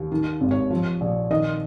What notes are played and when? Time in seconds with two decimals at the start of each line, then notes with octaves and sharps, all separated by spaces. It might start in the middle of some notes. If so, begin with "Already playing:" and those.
Already playing: D#2
0.12 D#3
0.41 G#1
0.51 C#5
0.70 F3
1.01 A#1
1.30 D#3 D#5